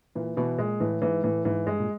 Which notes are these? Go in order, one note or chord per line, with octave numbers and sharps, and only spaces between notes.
A#2 E3
B2 E3
A#2 G#3
A2 E3
G#2 E3
A2 E3
G#2 E3
G2 G#3
A#2